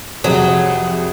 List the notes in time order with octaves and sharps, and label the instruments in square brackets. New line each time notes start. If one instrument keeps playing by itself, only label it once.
[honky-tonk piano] F2 C3 [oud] F#3 [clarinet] G#4